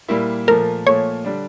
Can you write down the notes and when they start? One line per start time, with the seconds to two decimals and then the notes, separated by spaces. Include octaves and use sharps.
0.08 A#2 G3 A#3 E4
0.47 A#2 F3 A3 A#4
0.86 A#2 F3 A3 C#5
1.25 D3 G3 D4